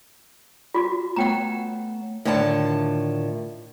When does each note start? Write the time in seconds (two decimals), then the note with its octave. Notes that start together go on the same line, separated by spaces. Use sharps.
0.75 F4 F#4
1.16 A3 B3 C#5 F#5 G5 A#5
2.25 A2 D3 D#3 F4 G#5 A5